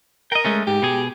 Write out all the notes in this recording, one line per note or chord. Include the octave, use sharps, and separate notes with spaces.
A#4 D#5 G5
G#3 A3 C#4
G#2 G4
B2 G#4